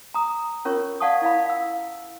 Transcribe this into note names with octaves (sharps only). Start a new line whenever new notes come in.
A#5 D#6
C#4 F4 A#4 C#5 C#6
D5 F5 F#5 A5 C#6 D#6
E4 D5 F5 B5
F5 E6